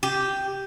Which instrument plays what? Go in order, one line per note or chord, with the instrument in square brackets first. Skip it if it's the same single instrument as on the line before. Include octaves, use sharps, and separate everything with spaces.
[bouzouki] G4